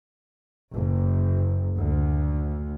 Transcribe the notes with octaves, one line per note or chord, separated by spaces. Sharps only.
F#1
D2